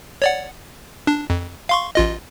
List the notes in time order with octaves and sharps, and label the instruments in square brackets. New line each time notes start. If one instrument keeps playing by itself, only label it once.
[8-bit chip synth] C#5 D5 F#5
D4
F2
F5 C6 C#6
A1 F4 D#5